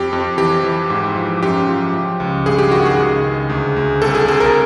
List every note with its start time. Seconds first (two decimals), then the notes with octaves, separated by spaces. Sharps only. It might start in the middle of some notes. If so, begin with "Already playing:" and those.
Already playing: F2 G4
0.13 F2
0.38 E3 G4
0.64 E3
0.90 G#2
1.16 F3
1.42 F#2 G4
1.68 F3
1.94 F3
2.20 C#2
2.46 G2 G#4
2.58 G4
2.71 D#3 F#4
2.86 G#4
2.99 C#2
3.23 C#2
3.49 D2
3.76 D2
4.02 C2 A4
4.15 G#4
4.28 C2 A4
4.40 A#4